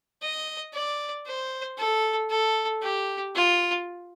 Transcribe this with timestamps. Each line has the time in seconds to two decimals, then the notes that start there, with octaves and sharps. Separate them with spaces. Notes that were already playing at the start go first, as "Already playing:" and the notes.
0.22 D#5
0.74 D5
1.26 C5
1.78 A4
2.30 A4
2.82 G4
3.35 F4